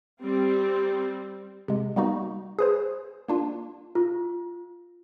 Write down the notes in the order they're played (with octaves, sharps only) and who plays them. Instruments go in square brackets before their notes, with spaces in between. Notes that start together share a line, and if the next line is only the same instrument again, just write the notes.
[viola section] G3 C4
[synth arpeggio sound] C3 G#3
G3 A#3 B3 D#4 F#4
G#4 B4 C5
A#3 D4 F4
[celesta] F4